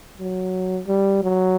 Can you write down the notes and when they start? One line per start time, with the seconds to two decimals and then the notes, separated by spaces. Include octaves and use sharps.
0.18 F#3
0.87 G3
1.23 F#3